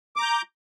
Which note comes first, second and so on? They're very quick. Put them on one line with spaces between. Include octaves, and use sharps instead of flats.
D6 A#5 G6